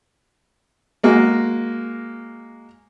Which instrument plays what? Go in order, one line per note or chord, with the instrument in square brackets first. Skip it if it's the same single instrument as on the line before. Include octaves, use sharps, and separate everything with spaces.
[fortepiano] G#3 A#3 F#4